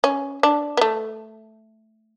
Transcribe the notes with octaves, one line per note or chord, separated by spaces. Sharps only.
C#4
D4
B3
A3